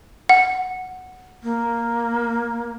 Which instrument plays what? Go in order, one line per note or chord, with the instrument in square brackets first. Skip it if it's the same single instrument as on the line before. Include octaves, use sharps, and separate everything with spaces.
[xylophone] F#5
[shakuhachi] A#3